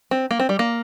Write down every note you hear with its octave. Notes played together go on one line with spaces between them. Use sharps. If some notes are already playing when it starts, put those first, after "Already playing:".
C4
A#3
C4
G3
A#3